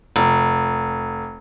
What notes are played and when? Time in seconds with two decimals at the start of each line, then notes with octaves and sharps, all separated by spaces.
0.16 F1